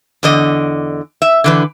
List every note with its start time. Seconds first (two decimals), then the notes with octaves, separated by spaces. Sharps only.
0.23 E2 D3 D#5
1.22 E5
1.44 D3 E3 B4